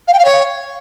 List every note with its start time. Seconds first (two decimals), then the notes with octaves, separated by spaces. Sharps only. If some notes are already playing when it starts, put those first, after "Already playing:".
0.07 F5
0.13 G5
0.18 F5
0.24 C#5